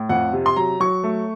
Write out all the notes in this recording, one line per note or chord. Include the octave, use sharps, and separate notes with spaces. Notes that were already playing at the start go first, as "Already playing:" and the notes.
Already playing: A2
F2 F#5
C3
C6
F#3 A#5
F#3 C#6
A3